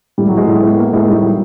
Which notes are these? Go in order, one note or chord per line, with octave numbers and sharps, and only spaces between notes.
A2 G3
F#3
G#3 E4
A2
B3
A#3
A2 G#3
G3 D#4
F#3